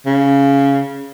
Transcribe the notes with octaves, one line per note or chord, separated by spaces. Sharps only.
C#3